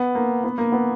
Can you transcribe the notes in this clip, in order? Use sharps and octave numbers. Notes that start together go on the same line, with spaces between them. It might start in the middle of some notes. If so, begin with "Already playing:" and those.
Already playing: B3
A#3
B3
A#3
B3